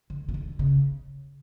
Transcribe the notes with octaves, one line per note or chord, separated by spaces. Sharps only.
D3
C#3
D3
C#3